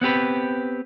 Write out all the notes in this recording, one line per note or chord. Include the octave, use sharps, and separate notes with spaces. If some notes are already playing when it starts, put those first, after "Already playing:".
B3 C4 G4 B4